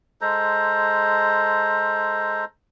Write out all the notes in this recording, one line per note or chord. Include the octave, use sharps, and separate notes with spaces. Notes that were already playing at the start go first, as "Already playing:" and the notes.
G#3 A4 C5 A#5